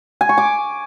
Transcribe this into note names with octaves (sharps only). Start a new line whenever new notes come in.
G#5
C#6
D6